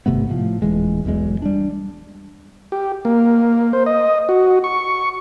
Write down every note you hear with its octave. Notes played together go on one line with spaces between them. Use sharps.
G#1 C3 A3 B3
A2 F3
D#1 E3 G#3
E1 B1 E2 G#3
G3 D4
G4
A#3
C5
D#5
F#4
C#6